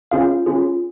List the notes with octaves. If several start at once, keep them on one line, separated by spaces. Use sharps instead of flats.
C#4 F4 G#4 F5
C#4 F4 G#4